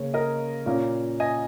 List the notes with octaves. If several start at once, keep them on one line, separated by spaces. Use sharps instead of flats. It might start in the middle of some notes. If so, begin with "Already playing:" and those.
Already playing: C#3 A#3 C#4 C#5
A#4 D#5
A#2 A#3 C#4
D#5 G#5